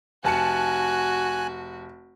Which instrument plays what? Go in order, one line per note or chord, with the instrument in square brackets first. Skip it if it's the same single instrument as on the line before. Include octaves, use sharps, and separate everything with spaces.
[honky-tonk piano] F1 A5 C#7 [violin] F#4 [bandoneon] G#5 F#6